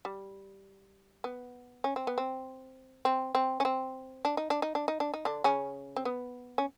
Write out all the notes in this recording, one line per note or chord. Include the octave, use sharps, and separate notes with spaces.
G3
B3
C#4
C4
B3
C4
C4
C4
C#4
C4
D4
D#4
D4
D#4
D4
D#4
D4
D#4
D3 D4
C#3 C#4
C4
B3
C#4